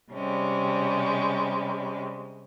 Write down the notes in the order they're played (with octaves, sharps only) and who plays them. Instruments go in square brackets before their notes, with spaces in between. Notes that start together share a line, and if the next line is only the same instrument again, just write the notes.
[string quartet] C3 G3 G#3 C#4